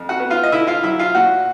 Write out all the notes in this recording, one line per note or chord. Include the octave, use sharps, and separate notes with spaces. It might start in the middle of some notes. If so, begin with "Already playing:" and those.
Already playing: F2
F#4 F#5
B3
F4 F5
D#5
D3 E4 E5
F4 F5
F#3 E4 E5
F4 F5
A#2 F#4 F#5